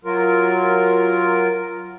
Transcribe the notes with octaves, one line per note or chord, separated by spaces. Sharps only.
F#3 F4 A#4